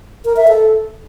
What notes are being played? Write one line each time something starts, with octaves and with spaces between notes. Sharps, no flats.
A#4
E5
A4